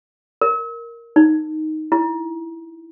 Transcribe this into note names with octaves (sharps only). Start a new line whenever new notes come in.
A#4
D#4
E4